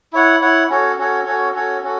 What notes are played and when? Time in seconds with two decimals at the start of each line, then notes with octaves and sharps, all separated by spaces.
0.13 E4 C#5 F#5
0.41 E4 C#5 F#5
0.70 C#4 F#4 A4 C#5
0.98 C#4 F#4 A4 C#5
1.26 C#4 F#4 A4 C#5
1.54 C#4 F#4 A4 C#5
1.83 C#4 F#4 A4